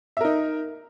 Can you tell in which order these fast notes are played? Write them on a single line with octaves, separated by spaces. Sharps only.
E5 A#4 D#4